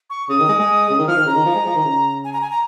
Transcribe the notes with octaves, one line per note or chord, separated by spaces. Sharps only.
C#6
C#3 D#6
D#3
G#3
G#3
C#3
D#3
F3 F6
D#3
C#3 A#5
D#3
F3
G#3
F3
D#3
C#3
G#5
A#5
G#5
A#5